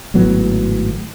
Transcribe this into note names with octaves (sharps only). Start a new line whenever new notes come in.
G#1 A2 F#3 B3